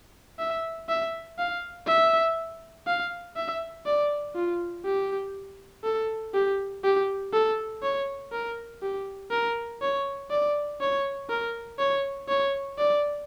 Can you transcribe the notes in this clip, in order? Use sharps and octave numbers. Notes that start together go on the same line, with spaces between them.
E5
E5
F5
E5
F5
E5
D5
F4
G4
A4
G4
G4
A4
C#5
A#4
G4
A#4
C#5
D5
C#5
A#4
C#5
C#5
D5